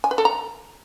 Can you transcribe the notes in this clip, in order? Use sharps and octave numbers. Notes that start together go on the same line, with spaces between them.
G#5
B4
A4
A#5